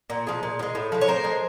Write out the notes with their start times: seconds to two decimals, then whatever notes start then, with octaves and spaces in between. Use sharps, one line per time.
0.10 A#2
0.27 F3 G#3
0.43 A#2
0.59 F3
0.63 G#3
0.75 A2
0.92 F3 G#3
1.01 C#5
1.07 A2 A#4 C5
1.24 F3 G#3